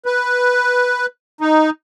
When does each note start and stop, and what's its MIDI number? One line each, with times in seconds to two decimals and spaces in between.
0.06 1.06 71
1.41 1.70 63